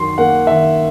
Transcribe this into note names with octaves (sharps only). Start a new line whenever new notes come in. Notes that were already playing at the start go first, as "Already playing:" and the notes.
Already playing: F#2 D#3 F#3 C6
A#3 F#5
D#3 E5